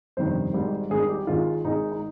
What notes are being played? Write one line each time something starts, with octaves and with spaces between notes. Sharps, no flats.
G1 F2 C3 D#3 G3 C5
G#1 G#2 G3
G#1 G#2 G3 G#4
G4
G#1 G#2 D#3 G#3 F4
G#1 G#2 D#3 G#3 D#4
D#4